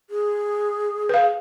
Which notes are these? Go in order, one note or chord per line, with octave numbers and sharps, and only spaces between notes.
G#4
B4 F5